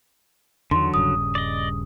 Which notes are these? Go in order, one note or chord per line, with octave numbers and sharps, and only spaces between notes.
E2 D3 D#3 F#3 C6
D#1 G2 C#3 D#6
D5 D#5